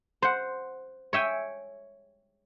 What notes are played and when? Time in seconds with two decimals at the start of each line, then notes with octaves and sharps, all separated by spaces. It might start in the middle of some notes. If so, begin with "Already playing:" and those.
0.22 C5 F#5
1.13 C#5 E5 G5 G#5